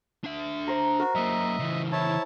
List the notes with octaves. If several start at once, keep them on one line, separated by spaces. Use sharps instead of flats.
D4 E5
C5 A#5
F#4 A#4
F#3 A#3 D#5 E5
C#3 E3
E4 C#5 A5